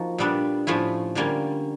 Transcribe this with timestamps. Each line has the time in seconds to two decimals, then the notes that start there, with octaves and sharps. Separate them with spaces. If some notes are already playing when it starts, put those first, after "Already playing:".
Already playing: F3 A#3 D#4 F#4
0.18 A#2 G3 B3 D4
0.67 A2 F3 A3 C#4 E4
1.15 D3 G3 A#3 C#4 F4